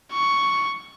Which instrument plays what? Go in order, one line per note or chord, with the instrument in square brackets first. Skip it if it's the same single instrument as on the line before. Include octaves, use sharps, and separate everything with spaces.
[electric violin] C#6